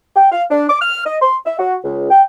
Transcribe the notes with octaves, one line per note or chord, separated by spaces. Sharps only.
G5
F5
D4
D6
F6
D#5
C6
E5
F#4
C#2
G5